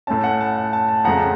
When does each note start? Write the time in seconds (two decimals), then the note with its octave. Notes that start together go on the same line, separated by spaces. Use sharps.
0.07 A2 A3 C#4 A5
0.24 F#5
0.41 A5
0.57 F#5
0.73 A5
0.88 A5
1.04 F2 C#3 F3 A3 F#5 A#5